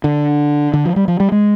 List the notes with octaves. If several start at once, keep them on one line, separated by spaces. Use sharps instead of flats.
D3
D3
F3
G3
F3
G3
G#3